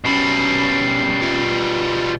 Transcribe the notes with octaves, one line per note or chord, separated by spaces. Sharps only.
B1 B2 G3 C#4 B5 C7
F4 E5